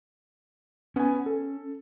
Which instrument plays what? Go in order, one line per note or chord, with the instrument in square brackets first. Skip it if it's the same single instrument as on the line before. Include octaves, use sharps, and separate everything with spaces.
[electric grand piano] B3 G#5 [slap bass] C#4
[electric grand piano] A4